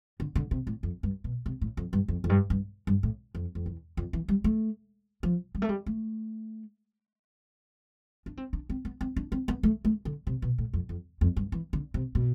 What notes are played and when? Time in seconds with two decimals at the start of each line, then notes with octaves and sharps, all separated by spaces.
0.20 D3
0.36 D3
0.51 C3
0.67 A2
0.83 F2
1.03 G2
1.24 B2
1.46 C3
1.61 A2
1.77 F2
1.93 G2
2.08 F2
2.24 F2
2.30 G2
2.50 G2
2.87 G2
3.03 A2
3.35 F2
3.55 F2
3.66 E2
3.97 F2
4.13 E3
4.28 G3
4.44 A3
5.23 F3
5.55 G3
5.62 A3
5.69 G3
5.86 A3
8.26 D4
8.37 C4
8.53 D4
8.69 C4
8.85 B3
9.01 C4
9.16 D4
9.32 C4
9.48 B3
9.63 A3
9.85 A3
10.05 D3
10.27 C3
10.42 B2
10.58 A2
10.73 F2
10.89 F2
11.21 F2
11.36 G2
11.52 E3
11.73 D3
11.94 C3
12.15 B2